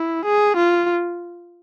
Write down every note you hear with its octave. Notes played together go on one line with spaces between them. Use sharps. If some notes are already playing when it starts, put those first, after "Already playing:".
Already playing: E4
G#4
F4